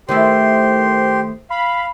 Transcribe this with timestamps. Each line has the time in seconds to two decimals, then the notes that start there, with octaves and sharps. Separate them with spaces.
0.09 D#3 A3 E4 G4 C5 C6
1.50 F5 B5